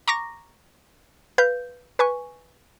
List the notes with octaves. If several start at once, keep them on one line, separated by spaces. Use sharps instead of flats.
A#5 C#6 D6 A#6
B4 F5 G6
B4 G#5 C#6